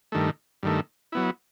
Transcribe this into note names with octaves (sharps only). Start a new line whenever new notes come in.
G2 D#3 A3
G2 D#3 A3
F#3 B3 E4